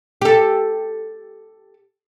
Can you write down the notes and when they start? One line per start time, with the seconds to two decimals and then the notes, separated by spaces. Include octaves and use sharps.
0.21 G4 A4